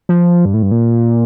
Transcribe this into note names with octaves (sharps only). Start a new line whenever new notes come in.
F3
G2
A2
G2
A#2